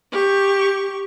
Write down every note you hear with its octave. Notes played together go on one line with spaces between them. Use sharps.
G4 C#6